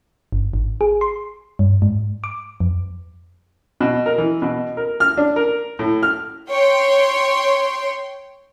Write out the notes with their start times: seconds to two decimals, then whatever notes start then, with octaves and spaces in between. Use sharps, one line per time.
0.32 G1
0.54 G#1
0.81 G#4
1.01 C6
1.59 G2
1.82 G#2
2.24 D6
2.60 F2
3.81 B2
4.06 A#4
4.18 E3
4.42 B2
4.77 A#4
5.00 F6
5.18 D4
5.36 A#4
5.79 A2
6.03 F6
6.50 C#5 G5 C6